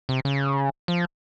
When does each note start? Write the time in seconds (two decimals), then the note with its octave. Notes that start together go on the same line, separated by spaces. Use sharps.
0.09 C3
0.25 C#3
0.88 F3